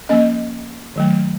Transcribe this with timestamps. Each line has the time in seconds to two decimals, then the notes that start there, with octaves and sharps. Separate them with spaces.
0.09 F3 A#3 C#4 D#5
0.96 D#3 F#3 A3